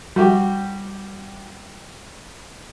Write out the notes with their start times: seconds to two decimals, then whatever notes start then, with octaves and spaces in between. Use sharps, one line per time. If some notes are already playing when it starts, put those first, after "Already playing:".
0.16 G3 F#4 G4